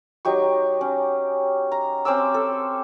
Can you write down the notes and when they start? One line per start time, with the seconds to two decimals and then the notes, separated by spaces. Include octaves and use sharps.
0.25 F#3 D#4 G4 C#6
0.81 C#4
1.72 A#5
2.05 C4 C#4 D6 E6
2.34 A4